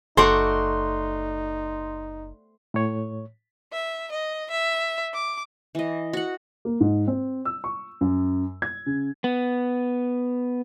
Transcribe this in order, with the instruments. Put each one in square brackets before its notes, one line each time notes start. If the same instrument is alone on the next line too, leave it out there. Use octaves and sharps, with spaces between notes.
[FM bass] F#1 [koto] A3 F#4 D5 [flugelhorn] D#4 [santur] C6
[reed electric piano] A2 C#5
[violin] E5
D#5
E5
D6
[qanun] E3 D#5
F#4 F#5
[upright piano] A#3
G#2
C4
E6
C#6
F#2
G#6
C#3
[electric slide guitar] B3